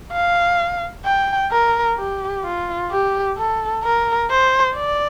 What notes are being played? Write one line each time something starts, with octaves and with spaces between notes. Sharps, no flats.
F5
G5
A#4
G4
F4
G4
A4
A#4
C5
D5